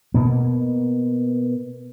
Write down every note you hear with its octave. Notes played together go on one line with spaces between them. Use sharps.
B2 A#3